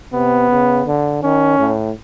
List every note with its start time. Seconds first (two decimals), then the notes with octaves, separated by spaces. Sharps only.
0.13 C3 B3
0.50 C#3
0.86 D3
1.23 D#3 C#4
1.59 A2